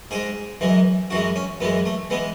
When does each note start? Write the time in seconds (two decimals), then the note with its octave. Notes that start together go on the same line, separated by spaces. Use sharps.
0.11 G#2 G#3 G#4
0.61 F#2 E3 G#3
1.10 F#2 E3 G#3 F#4
1.36 C#4
1.60 F#2 B3
1.63 E3 G#3
1.85 A3
2.10 E3 G#3 B3